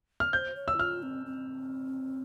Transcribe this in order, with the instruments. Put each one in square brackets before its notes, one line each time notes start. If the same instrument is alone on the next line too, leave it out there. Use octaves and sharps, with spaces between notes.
[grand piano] F6
[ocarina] C5 [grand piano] G6
[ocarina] C#5
[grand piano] E6
[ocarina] E4
[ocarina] F4 [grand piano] F6
[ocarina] C4
C4